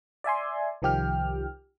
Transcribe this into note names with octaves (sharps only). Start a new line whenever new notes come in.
D5 E5 G#5 C6
C2 D#3 F3 G4 G5 F6